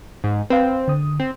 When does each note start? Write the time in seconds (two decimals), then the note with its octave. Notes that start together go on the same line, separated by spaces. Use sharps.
0.24 G#2
0.50 C4 B4 F5
0.88 D3 D#6
1.20 C4